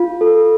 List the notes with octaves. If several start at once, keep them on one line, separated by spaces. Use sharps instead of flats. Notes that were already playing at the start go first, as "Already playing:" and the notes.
Already playing: F4
A4